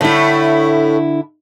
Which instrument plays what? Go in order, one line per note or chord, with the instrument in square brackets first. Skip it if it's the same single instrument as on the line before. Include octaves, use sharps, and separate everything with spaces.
[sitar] A2 A3 [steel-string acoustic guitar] D3 E4